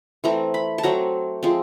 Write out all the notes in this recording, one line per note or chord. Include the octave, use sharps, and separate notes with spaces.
E3 A3 C4 A#5
B5
A5
F#3 A3 C4 A#5
F3 G#3 C4